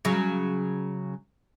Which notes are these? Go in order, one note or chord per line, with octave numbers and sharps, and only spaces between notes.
C#3 F#3